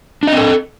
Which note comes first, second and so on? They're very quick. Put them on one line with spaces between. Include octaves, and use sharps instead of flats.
D4 D#5 C4 A4